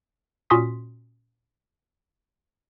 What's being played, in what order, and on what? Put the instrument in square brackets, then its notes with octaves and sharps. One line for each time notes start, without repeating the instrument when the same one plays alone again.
[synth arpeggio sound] A#2 C#4 F#4 C6 D#6 B6